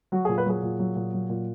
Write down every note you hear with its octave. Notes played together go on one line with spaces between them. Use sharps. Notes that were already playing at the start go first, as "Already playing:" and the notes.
F#3 F#4
A#2 G#4
B4
F#3 G#4
A#2
F#3
A#2
F#3
A#2